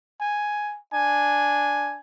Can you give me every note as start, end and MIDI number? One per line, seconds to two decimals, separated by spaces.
0.20 0.78 80
0.93 1.98 62
0.93 1.99 80